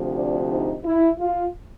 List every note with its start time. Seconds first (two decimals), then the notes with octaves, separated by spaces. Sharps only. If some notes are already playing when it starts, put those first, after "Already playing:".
Already playing: D2 C3 F3
0.13 D4
0.48 D#4
0.84 E4
1.20 F4